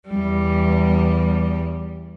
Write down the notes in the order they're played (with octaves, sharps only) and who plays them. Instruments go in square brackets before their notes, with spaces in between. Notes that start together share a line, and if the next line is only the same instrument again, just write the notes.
[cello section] E2 G3